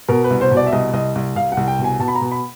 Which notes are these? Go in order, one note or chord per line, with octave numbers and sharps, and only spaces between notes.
B2 A#4
B4
C2
C5
B2
D5
E5
C2 D#5
C2 D#5
C2
C2 F5
F#5
C2
G5
B2
G#5
B2 A5
B5
A#5
B2
B5